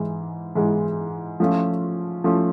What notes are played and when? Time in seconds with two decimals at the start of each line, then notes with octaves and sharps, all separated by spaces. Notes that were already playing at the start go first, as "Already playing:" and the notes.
Already playing: G#2 E3 G#3
0.55 G#2 E3 G#3
1.40 F3 A3 C#4 F4
2.24 F3 A3 C#4 F4